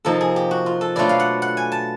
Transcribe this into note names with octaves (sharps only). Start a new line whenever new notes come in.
C3 F3 A#3 D#4 A4
G#4
G4
F#4
F4
A4
B2 F#3 A3 D4 F4 D5
F5
F#5
F#5
G#5
A5